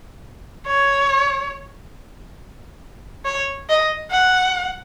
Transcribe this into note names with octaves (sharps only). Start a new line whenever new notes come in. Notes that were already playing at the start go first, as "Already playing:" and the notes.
C#5
C#5
D#5
F#5